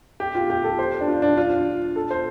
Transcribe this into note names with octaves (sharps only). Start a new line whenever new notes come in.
G4
F4
G4
A4
C5
D4
F4
D4
F4
A4
C5